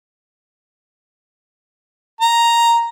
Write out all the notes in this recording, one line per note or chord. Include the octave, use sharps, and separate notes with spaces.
A#5